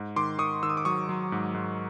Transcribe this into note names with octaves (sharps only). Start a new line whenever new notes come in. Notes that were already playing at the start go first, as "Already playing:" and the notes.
Already playing: G#2
D#3 C6 D6
D#3 C#6 D#6
D#3 E6
D#6
D6
F#3 C#6 D#6
F#3
G#2
G#2